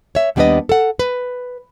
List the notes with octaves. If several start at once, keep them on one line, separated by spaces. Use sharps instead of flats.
C#5 E5
D#2 G3 B3 D4 B4 D#5
A4 F#5
B4